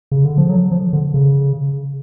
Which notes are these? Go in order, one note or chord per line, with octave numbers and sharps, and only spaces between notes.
C#3
D3
F3
F#3
F3
D3
C#3